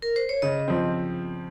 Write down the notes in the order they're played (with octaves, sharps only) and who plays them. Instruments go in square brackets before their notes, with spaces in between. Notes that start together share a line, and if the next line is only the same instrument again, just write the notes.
[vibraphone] A#4
C5
C#5
[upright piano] C#3 [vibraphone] D#5
[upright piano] F3 C4